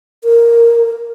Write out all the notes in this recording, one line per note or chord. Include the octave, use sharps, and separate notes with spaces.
A#4